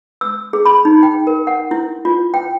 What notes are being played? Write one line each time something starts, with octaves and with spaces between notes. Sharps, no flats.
E6
G#4
B5
D#4
G5
A#4
F#5
E4
F4
G5